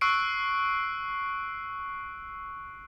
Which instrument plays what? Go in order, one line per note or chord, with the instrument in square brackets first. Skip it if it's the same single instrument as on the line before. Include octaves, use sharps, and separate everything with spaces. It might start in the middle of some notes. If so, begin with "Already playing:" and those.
[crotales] C#6 E6 F#6 C7 D7